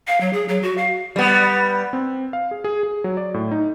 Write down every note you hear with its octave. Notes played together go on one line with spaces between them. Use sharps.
F5
F#3
G#4
F#3
F#4
F5
G3 B3
C4
F5
G#4
G#4
G#4
F#3
D5
A2
D#4